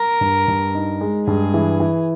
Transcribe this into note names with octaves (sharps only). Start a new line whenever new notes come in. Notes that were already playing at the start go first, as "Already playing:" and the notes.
Already playing: A#4
G2
G2
D#4
G#3
G2 G#4
E3
E3